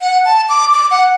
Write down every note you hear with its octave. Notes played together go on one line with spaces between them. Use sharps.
F#5
A5
D6
D6
F#5